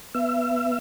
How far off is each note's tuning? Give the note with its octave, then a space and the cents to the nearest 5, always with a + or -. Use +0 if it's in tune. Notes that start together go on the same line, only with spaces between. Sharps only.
B3 +0 E5 +35